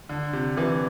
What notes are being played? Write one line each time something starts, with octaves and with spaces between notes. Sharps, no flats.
D3
C3
C3 E3